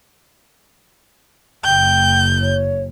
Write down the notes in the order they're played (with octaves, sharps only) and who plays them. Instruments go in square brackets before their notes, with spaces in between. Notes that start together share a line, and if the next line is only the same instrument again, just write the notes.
[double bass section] F#1 [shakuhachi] G5 [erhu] G6
[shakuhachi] C#5